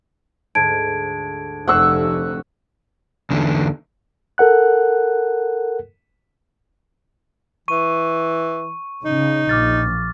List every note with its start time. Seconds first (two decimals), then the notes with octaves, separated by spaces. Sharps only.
0.55 D2 G#2 A5 G#6 D7
1.68 F1 C3 A3 D4 C5 F#5 C#6 E6
3.30 E2 D3
4.38 A4 A#4 F#5 F#6
7.68 E3 C#6 D#7
9.05 C#3 D#4
9.49 A#1 D6 F6 A6